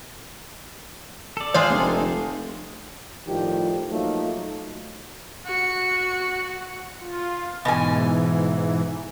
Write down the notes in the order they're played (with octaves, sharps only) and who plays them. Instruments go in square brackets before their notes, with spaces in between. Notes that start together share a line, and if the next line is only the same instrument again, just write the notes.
[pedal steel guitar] A4 D5
[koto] G#3 F4 F5 [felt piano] C5
[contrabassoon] F1 [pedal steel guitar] A3 D4 D#4
[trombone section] A2 D#3 F3 G3 G4
F3 F#3 A3 A#3 D#4
[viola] F#4 [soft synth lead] C#7
[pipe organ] F4
[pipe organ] G#2 E3 [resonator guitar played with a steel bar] B2 G#5